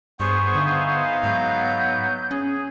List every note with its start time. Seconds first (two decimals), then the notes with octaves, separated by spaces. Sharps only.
0.20 G2 B3 G#4 C5 C#6
0.55 D3 D#4 E5 F5
1.23 G#2 F#3 B3 G6
2.31 C#4 G#4